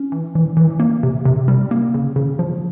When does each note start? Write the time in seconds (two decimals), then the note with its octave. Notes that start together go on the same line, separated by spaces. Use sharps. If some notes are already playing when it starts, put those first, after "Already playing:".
Already playing: C#4
0.12 E3
0.35 E3
0.57 E3
0.80 A#3
1.03 C3
1.25 C3
1.48 G3
1.71 A#3
1.94 C#3
2.16 C#3
2.39 F3